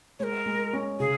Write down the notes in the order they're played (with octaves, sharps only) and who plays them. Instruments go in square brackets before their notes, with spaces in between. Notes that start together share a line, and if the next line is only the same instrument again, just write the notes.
[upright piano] G#3 [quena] A#4 C#5
[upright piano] G#3
C#4
[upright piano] C#3 [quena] G#4